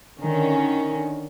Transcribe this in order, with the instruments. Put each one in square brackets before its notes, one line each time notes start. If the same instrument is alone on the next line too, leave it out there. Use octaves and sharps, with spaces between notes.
[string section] D3 D#3 C#4